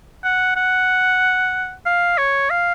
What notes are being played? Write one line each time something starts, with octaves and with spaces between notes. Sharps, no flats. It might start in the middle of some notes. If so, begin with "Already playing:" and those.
F#5
F#5
F5
C#5
F5